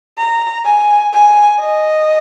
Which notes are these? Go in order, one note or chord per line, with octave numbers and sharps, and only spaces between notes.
A#5
G#5
G#5
D#5